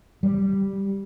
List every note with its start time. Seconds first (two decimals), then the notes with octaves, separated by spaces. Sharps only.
0.23 G3